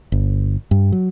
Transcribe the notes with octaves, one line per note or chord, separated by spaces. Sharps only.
G1
G2
F#3